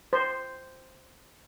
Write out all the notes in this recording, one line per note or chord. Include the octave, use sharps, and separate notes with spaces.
C5